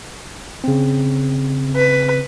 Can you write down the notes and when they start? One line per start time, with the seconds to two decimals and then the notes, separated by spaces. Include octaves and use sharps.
0.64 C#3 C4
1.76 B4